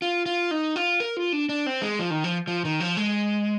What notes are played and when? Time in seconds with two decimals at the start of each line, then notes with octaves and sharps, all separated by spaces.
0.02 F4
0.26 F4
0.51 D#4
0.76 F4
1.00 A#4
1.17 F4
1.33 D4
1.49 D4
1.66 C4
1.82 G#3
1.99 F3
2.10 D#3
2.24 F3
2.47 F3
2.65 D#3
2.80 F3
2.97 G#3